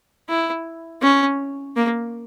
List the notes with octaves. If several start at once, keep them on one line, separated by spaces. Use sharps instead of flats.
E4
C#4
A#3